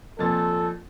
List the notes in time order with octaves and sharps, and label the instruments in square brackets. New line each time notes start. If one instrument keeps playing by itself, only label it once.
[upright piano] F2 A#2 A6 [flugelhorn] A4